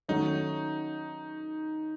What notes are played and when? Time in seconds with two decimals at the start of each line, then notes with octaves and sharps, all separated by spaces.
0.09 D#3 F#3 A3 C#4 D#4